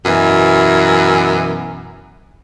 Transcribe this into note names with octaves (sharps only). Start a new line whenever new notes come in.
F#2 B2 E3